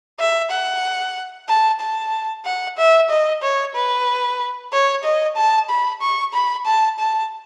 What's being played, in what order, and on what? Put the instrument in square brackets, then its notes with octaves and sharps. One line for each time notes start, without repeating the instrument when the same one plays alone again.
[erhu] E5
F#5
A5
A5
F#5
E5
D#5
C#5
B4
C#5
D#5
A5
B5
C#6
B5
A5
A5